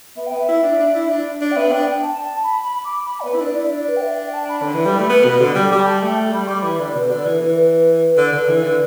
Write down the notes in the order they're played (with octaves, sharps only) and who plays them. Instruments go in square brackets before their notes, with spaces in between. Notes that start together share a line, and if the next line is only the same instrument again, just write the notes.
[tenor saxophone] B3 [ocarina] E5
[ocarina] G5
[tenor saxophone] B3
[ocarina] E5
[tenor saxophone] E4
D4
D4
E4
D4
[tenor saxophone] D4 [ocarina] D5
[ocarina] G5
[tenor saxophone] B3 [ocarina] E5
[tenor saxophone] D4 [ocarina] G5
[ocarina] G5
A5
A5
B5
B5
D6
B5
D5
[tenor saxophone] B3 [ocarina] B4
[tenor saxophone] E4
[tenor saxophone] D4 [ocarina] D5
[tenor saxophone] E4
[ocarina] D5
[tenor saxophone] D4
[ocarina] B4
G5
E5
G5
A5
B5
[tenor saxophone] D3
E3
G3
A3
B3
B2
D3
G3
[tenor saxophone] G3 [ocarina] D6
[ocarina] G5
A5
[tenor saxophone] A3 [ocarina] G5
[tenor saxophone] G3 [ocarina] B5
[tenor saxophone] G3 [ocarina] D6
[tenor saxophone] E3 [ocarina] B5
[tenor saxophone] D3 [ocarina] D5
[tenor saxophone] B2 [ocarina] B4
[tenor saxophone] D3 [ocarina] D5
[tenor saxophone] E3 [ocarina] B4
[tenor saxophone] E3 [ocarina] B4
[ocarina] B4
[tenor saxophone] D3
D3
E3
D3